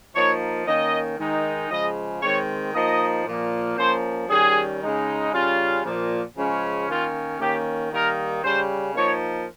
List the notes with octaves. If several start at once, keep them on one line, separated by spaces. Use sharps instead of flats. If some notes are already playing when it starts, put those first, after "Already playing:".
F3 A#3 D#4 C#5
D#3 A#3 C#4 D#5
D#3 G#3 D#4
C#3 F3 G#3 D#5
D#3 G#3 C4 C#5
F3 A#3 D#4 D#5
A#2 F3 A#3
F3 A#3 C#4 C5
D#3 G3 C#4 G#4
C#3 G#3 D#4
C#3 G3 C#4 F4
A#2 F3 A#3
C#3 F3 G#3 C#4
D#3 A#3 C#4 F4
D#3 A#3 C#4 G4
D#3 G3 A#3 D#4 A#4
C#3 G3 C#4 C5
F3 A#3 D#4 C#5